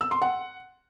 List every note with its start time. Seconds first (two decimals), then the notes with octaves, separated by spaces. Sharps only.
0.01 E6
0.11 C6
0.22 F#5